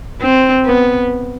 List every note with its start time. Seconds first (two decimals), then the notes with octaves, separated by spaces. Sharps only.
0.22 C4
0.66 B3